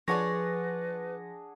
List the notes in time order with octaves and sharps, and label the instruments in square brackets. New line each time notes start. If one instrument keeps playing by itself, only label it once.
[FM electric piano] F3 A#6 [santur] D4 G#4 F#5 [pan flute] B4 [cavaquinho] C#5 D5